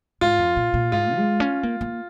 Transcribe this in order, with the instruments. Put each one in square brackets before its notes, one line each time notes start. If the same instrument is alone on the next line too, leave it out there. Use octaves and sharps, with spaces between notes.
[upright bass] G#2 [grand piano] F4
[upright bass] F2
A#2
A#2
[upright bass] G#2 [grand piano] F4
[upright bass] G#3
C#4
A#3
A#3